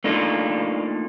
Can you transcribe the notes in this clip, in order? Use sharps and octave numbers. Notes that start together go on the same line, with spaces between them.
A3 A#3 D4 D#4 F4